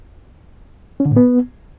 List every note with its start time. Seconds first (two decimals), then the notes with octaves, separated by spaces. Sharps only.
1.00 C#4
1.05 D3
1.11 A2
1.16 B3